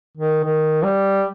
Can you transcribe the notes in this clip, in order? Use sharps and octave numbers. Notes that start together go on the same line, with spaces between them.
D#3
D#3
G3